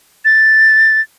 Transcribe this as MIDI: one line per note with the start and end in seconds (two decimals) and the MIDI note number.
0.25 1.01 93